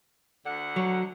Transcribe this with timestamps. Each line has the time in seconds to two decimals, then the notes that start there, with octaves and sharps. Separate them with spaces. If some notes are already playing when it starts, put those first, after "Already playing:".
0.45 D2 D3 F#5
0.76 F#3